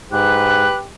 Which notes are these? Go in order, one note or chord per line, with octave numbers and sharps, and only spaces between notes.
G#2 G4 B4 F#6